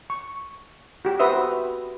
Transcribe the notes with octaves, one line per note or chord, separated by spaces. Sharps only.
C#6
F#4 G4
F#4 B4 C5 E5 D#6